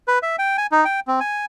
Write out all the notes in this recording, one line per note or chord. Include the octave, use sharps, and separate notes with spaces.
B4
E5
G5
G#5
D#4
G5
C4
G#5